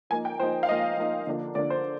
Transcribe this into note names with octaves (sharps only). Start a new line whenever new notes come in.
F3 A#3 D#4 G#5
G5
F3 A#3 D#4 C5
F5
F3 A#3 D#4 D#5
F3 A#3 D#4
D3 F3 A#3 D4
D3 F3 A#3 D4 D5
C5